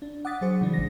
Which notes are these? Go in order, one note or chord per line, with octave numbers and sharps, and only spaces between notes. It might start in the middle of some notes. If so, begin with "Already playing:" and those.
D4
F#5 D6 D#6 A6 B6
F#3 G#4 C5 C#7
C#3 E3 F3 G3 D4
G#1 G#3 A#6